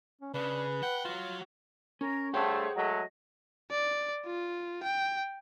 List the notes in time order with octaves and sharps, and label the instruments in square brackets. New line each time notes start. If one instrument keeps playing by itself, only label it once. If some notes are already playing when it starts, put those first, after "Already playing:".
[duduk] C#4
[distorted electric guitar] C#3 [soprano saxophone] D4 [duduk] B4
[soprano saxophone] F#5 [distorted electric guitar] G5
[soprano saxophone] F4 [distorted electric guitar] F#4 C#5
[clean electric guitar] C#4 [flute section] A#4
[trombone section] G2 A3 [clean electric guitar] G#4 F#5 G5 [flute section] C5 C#5
[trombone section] F#3 G#3 A3 [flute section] D#5
[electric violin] D5
F4
G5